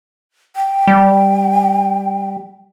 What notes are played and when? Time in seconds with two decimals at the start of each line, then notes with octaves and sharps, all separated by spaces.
0.56 G5
0.87 G3